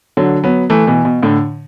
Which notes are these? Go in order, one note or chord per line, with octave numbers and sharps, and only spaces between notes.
D3 F#3
F#3 B3
E3 A3
B2 E3
B2
A2 D3